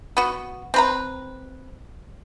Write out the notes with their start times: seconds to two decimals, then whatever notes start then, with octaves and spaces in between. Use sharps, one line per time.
0.17 B3 F#4
0.74 C4 B4 A#5